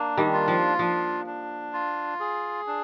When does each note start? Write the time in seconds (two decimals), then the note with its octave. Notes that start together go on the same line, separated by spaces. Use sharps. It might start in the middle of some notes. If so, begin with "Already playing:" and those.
Already playing: A#3 D4
0.17 D#3 G3
0.33 F4
0.48 F3
0.79 F3 D4
1.26 D4
1.73 F4
2.20 G#4
2.67 D4